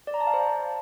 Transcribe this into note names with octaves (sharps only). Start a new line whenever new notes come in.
D5
A#5
A5
F5
C5